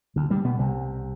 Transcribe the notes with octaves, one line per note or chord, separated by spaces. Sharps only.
D2 D3
G2 G3
B2 B3
C2 C3